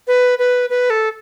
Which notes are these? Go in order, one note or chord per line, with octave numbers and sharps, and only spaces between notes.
B4
B4
B4
A4